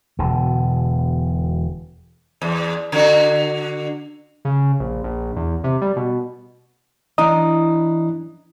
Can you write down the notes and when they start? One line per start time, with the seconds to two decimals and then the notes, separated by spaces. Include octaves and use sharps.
0.19 E1 B2 D3
2.41 E2
2.92 D3 F#4
4.45 C#3
4.80 A#1
5.04 A#1
5.36 E2
5.64 C3
5.82 G3
5.96 B2
7.18 E3 D4 D#5 A#5 D#6